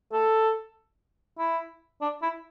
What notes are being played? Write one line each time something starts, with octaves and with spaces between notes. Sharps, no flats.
A4
E4
D4
E4